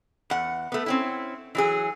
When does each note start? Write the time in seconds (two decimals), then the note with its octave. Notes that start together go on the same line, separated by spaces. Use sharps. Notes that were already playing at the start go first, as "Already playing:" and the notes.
0.30 E2 F#5
0.72 A3 B3
0.86 C4 C#4 E4
1.55 E3 F#3 G#4